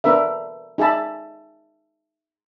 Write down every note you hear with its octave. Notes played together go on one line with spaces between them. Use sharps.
B3 D4 A#4 B4 E5
D#4 G#4 E5 A5 B5